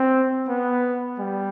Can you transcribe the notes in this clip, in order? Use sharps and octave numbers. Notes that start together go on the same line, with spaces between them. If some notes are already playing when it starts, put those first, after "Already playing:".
Already playing: C4
B3
G3